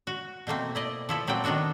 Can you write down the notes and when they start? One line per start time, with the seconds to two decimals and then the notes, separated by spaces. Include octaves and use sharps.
0.07 F#4
0.47 B2 A3 A#3 C4
0.75 E4 D5 D#5
1.09 F3 E4 A4
1.27 A#2 F#3 C4 F4 D5 G5
1.44 D#3 B3 D4 F#4 A4